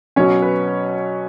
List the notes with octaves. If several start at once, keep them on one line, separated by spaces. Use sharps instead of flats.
B2 F#3 C#4 C#5
B4